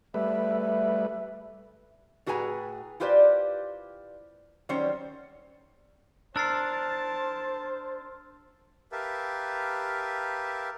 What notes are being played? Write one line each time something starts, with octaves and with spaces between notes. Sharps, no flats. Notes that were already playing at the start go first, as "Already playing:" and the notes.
G3 A3 B4 E5
E5
A2 F#4 G#4 B4 G#5 A#5
E4 F4 G4 B4 C5 D5
D#3 F#3 G3 C#4 C5 C#5
D4 A#4 C5 A5 E6 A6 C7
G4 A#4 B4 E5 F5 A5